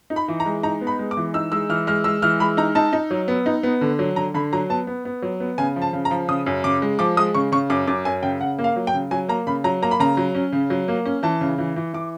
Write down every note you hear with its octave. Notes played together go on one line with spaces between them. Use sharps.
D#4
B5
E3
A#5
G#3
D#4 A#5
B3
B5
G#3
D6
E3
D#4 E6
G#3 E6
E3 F6
G#3 F6
G#3 E6
E3 F6
G#3 B5
D#4 A#5
D#4 A5
D#4
F#3
B3
D#4
B3
D3
F#3
D3 A#5
D3 B5
F#3 A#5
B3 A5
B3
B3
F#3
B3
C#3 G#5
F3
A5
C#3
A#5
F3
C#3 D#6
F#2
C#3 D6
G#3
F3 D6
G#3 D#6
C#3 C#6
C#3 C#6
F#2 D6
F#2 D6
F#2 G#5
C#3 G5
C#3 F#5
A#3
F5
F#3
G5
C#3
F#3 G#5
A#3 A#5
C#3 B5
F#3 A#5
A#3 A#5
B5
C#3 A#5
F#3
C#4
C#3
F#3
A#3
C#4
E3 A5
C#3
E3
E3
E3 D6